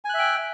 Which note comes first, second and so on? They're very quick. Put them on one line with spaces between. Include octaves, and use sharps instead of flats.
G#5 F#6 E5 G5